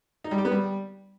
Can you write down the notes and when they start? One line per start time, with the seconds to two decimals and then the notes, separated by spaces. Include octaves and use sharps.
0.24 D#4
0.31 G3
0.38 G4
0.45 B3
0.52 G3